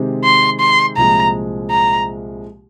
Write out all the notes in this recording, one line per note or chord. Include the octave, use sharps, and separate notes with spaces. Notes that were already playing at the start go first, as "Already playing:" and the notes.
Already playing: C3 D#3 G#3 C4 G4
C6
C6
C2 A#2 F3 G#3 A#5
A#5